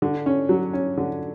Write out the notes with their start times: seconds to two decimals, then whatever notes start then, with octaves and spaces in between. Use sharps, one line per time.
0.02 D3
0.26 C#4
0.49 F#3
0.73 C#4
0.97 D3